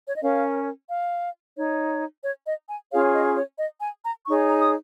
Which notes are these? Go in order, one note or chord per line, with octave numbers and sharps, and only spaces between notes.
C#5
D#5
C#4 A#4 C#5 F5
F5
D#4 C#5
C#5
D#5
G#5
C#4 F4 G#4 C#5 F5
D#5
C#5
D#5
G#5
A#5
D#4 G#4 C#5 C#6
A#5
D#6